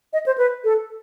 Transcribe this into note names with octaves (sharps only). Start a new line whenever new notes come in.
D#5
C5
B4
A4